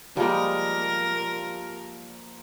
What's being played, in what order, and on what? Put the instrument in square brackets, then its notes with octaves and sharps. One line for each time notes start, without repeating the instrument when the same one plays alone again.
[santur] F3 A#3 [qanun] G3 G#3 [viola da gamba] A#4